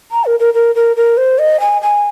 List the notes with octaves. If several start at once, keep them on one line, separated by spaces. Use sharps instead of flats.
A#5
A#4
A#4
A#4
A#4
A#4
C5
D#5
G#5
G#5